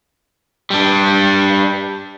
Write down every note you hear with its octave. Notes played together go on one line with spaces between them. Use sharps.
G3 D4